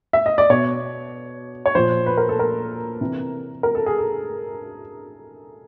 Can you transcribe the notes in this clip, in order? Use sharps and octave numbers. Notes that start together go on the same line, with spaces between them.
E5
D#5
D5
B2 C#5
C#5
A#2 F3 C5
B4
A#4
A4
A#4
C3 E3
A#4
A4
G#4
A4